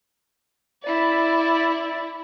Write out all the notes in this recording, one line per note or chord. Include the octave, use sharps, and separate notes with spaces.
E4 D5